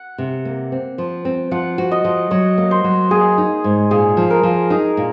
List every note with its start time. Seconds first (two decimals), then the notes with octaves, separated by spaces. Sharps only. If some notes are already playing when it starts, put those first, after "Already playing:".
Already playing: F#5
0.18 C3
0.45 A#3
0.72 C4
0.98 F3
1.25 C4
1.51 F3 F#5
1.78 F#4
1.91 D#5
2.05 F3
2.31 F#3 C#5
2.58 A#3
2.71 C5
2.84 F#3
3.11 A#3 G#4
3.38 D#4
3.64 G#2
3.91 A#2 G#4
4.17 F3
4.30 A#4
4.43 F3
4.70 D#4 G#4
4.97 A#2